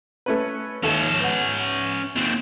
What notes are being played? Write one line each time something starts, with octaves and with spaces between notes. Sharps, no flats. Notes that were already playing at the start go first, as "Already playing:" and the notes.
A3 C#4 B4
D#2 C#4 A4 E5
B3 F#5
D#2 C4